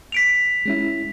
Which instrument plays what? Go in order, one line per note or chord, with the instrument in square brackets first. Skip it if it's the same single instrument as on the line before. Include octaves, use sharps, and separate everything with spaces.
[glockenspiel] B6 D7 F7
[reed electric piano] G#3 C#4 E4